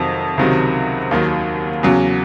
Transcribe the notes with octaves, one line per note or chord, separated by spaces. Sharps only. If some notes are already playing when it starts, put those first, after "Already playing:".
Already playing: F2 C3 D#3 F#3
C#2 C3 D#3 F#3
D#2 D#3 F#3
E2 C#3 F#3